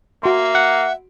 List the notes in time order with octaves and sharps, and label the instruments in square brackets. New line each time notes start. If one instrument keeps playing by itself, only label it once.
[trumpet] A#3 [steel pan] F#4 C6 [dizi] E5
[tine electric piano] F#5